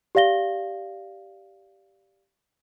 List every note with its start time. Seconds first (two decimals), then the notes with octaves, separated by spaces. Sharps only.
0.15 G4 D5 F5 A#6 G7